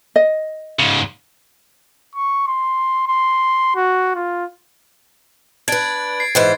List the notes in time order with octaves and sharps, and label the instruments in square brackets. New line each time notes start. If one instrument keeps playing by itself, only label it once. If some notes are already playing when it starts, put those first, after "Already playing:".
[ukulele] D#5
[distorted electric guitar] G#2 C#3
[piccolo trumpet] C#6
C6
C6
F#4
F4
[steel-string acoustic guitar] D4 B4 [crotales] G#6 A6 D7
[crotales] C7
[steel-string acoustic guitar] G#2 E3 C5